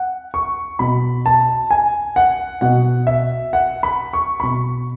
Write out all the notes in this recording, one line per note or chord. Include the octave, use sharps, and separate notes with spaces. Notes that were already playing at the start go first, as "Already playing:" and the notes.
Already playing: F#5
C#6
B2 B5
A5
G#5
F#5
B2 F#5
E5
F#5
B5
C#6
B5
B2 C#6